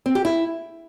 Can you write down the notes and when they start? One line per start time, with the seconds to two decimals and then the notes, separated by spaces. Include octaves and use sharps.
0.06 C4
0.15 G4
0.25 E4